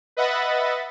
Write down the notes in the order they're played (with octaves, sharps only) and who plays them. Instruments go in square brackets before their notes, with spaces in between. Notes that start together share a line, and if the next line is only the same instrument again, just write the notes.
[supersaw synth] B4 D#5 E5 F#5 B5 A6